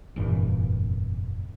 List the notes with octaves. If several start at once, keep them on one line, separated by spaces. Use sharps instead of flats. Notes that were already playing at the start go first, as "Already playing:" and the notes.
F1 G2 A#2 E3